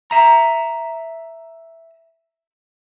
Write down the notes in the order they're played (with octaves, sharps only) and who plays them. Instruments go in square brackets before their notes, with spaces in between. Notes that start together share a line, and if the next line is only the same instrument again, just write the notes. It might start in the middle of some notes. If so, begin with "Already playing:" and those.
[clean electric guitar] E5 A#5